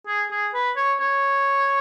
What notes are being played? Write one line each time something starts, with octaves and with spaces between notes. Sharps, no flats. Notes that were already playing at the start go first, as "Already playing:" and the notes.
G#4
G#4
B4
C#5
C#5